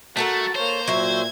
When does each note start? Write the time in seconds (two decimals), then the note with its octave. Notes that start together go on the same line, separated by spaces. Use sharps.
0.17 A3 F#4 A4 A#4 F#5 A5
0.55 A#3 C5 C#5 F7
0.88 A#2 F#3 E5 G#6